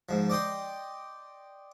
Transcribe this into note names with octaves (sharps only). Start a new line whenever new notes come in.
G#2 F3
D5 D#5 G5 C6